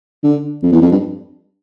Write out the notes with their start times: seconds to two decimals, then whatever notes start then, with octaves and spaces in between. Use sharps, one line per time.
0.24 D3
0.63 F2
0.72 E2
0.82 F2
0.92 G2